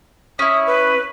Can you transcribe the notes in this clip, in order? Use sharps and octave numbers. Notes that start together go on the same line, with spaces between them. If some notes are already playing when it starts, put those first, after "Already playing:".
C#4 E4 D#6
B4